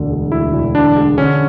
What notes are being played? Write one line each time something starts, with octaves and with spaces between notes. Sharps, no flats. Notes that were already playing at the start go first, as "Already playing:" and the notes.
Already playing: E1 D2 D3
G#3
D2 E4
E1
D3 D4
G#3
D3 C#4